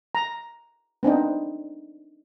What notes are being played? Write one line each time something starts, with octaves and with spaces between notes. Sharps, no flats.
A#5
B3 C4 D4 D#4